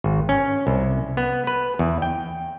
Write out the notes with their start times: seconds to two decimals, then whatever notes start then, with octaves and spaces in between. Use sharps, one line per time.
0.04 G#1
0.29 C#4
0.67 C2
1.17 B3
1.47 B4
1.79 E2
2.02 G5